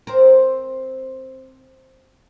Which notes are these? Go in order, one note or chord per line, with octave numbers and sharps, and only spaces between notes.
C4 A#4